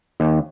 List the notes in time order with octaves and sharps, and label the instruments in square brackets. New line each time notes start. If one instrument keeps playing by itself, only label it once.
[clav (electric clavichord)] D#2